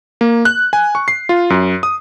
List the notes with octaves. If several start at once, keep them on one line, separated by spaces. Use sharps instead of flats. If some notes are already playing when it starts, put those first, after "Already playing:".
A#3
F#6
G#5
C#6
C7
F4
F#2
D#6